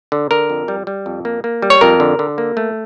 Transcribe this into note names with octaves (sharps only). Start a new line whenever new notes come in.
D3
D3 A#4
F2
G3
G3
F2
A#3
A#3
G3
C#5
F2 A#4
D3
D3
A#3
A3